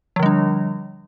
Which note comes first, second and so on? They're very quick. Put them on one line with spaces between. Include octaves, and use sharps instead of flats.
F3 D3 G3 D4